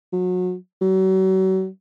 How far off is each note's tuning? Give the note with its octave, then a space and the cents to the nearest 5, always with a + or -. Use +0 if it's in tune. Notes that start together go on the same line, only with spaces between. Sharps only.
F#3 -30
F#3 +35